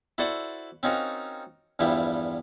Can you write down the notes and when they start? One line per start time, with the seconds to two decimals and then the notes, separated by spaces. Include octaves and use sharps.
0.18 E4 F#4 A4 C5 D5 F#5
0.83 C4 C#4 D#4 F4 F#4 A#4
1.79 E2 G2 F3 G3 E4